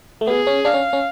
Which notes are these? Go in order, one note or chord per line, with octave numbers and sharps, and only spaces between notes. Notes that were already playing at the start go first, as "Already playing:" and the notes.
A3
B3 G#4
C#4
D4 F5
C#4
C#4